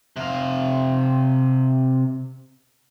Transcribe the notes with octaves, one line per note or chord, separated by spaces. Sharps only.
C3 F5